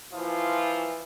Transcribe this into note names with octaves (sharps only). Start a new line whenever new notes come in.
A#2 E3 F3 E4 F4